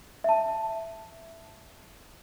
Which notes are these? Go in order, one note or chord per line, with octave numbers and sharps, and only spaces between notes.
E5 A5